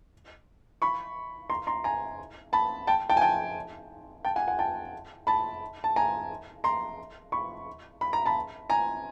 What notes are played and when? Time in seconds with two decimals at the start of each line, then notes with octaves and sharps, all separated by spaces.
0.82 B5 C#6
1.50 A#5 C6
1.67 A#5 C6
1.84 G#5 A#5
2.53 A5 B5
2.87 G5 A5
3.10 G5 A5
3.17 G#5
3.21 G5 A5
4.25 G5 A5
4.36 F#5 G#5
4.48 F#5 G#5
4.59 G5 A5
5.27 A5 B5
5.84 A5
5.96 G#5 A#5
6.64 A#5 C6
7.32 B5 C#6
8.01 B5
8.13 A#5
8.26 A5 B5
8.70 G#5 A#5